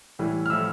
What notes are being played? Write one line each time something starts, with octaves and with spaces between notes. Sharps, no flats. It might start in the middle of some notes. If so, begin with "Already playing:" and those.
A2 E3 G3
F6
A2 F3 A3 E6